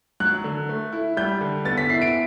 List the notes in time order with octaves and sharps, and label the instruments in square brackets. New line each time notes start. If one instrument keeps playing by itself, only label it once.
[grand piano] F#3 [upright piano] F#6
[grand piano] D3
A3
E4
[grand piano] G3 [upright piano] G6
[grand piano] D3
[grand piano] B3 [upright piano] A6
[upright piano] B6
[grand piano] E4 [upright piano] C7
[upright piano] D7